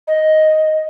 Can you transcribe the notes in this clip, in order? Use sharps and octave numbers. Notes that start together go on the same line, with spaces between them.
D#5